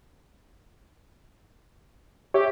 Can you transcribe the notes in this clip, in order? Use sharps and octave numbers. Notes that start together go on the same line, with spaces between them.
G4 C#5 E5